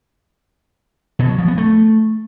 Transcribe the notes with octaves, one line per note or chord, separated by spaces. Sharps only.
B2
F#3
F3
B3
A3